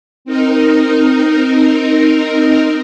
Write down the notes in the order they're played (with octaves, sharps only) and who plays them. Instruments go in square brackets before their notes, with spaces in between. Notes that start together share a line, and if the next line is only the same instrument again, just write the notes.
[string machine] C4 D#4 A#4